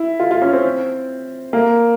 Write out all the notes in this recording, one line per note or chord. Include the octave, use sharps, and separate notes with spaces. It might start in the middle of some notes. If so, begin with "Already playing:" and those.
Already playing: E4
F4
F4
C#4
C4
A#3